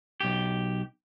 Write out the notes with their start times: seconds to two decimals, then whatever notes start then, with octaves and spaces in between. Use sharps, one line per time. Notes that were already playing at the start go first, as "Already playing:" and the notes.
0.21 B1 G4